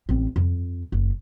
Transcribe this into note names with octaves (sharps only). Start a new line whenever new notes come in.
A1 C4
F2
F#1